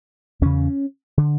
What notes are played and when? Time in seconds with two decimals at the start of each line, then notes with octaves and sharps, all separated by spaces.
0.42 E2 C#3 C#4
1.18 D3